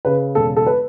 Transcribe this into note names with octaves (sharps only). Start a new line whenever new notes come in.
C#3 B4
E1 A4
A4
B4